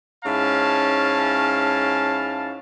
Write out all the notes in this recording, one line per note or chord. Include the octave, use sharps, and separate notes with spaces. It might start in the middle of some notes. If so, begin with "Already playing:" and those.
G#2 C#4 E4 F5 A5